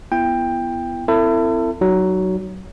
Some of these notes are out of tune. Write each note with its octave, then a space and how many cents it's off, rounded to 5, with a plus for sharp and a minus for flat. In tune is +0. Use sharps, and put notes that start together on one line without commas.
B3 +0 E4 +30 G5 +15
C4 -15 E4 +25 A4 +35
F#3 +20 D#4 -10